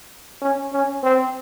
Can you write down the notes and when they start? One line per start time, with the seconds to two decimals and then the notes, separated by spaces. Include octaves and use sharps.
0.42 C#4
0.73 C#4
1.04 C4